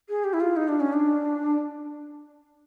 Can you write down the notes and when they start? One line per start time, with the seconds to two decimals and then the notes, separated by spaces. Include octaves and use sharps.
0.09 G#4
0.24 G4
0.33 E4
0.40 F4
0.56 D#4
0.68 D4
0.80 C#4
0.93 D4